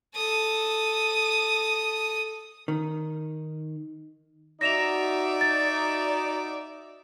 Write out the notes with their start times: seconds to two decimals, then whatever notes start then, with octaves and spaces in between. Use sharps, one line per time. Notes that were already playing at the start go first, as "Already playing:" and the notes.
0.15 A4 D#6
2.68 D#3
4.61 D#4 F#4 D5 E5 D6 A#6 E7 F7
5.41 A6